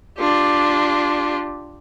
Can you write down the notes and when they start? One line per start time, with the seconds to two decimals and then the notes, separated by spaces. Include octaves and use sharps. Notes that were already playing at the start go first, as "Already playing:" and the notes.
0.18 D4 F4 G4